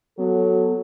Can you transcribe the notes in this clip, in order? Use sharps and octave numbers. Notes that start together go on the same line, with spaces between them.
F#3 B3 A4